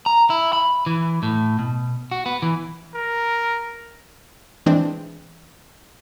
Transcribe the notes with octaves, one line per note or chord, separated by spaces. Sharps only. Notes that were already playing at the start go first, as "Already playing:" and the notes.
A#5
E4
B5
E3
A2
B2
F#4
B3
E3
A#4
E3 G#3 C4 D4